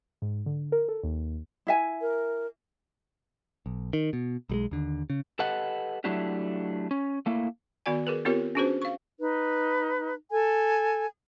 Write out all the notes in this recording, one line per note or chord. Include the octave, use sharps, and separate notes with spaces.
G#2
D3
A#4
A4
D#2
E4 E5 G#5
A#4
B1
D#3
B2
B1 G3 G#3
D#2 D3
C#3
G4 A4 B4 D#5 F#5
F#3 A3 D4 E4 F#4 G4
C#4
A3 A#3 E4
D#3 B3 F#4 D5 G#5
G#4 A#4 B4
B3 C4 F4 G4 A#4 C#5
C#4 D4 F#4 G#4 B4 C5
F5 C#6
D#4 B4
A4 G#5